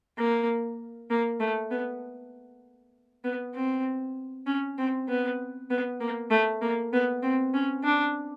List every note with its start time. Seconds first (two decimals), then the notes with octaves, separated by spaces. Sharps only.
0.18 A#3
1.11 A#3
1.40 A3
1.71 B3
3.24 B3
3.55 C4
4.47 C#4
4.78 C4
5.09 B3
5.70 B3
6.00 A#3
6.31 A3
6.62 A#3
6.93 B3
7.23 C4
7.54 C#4
7.84 D4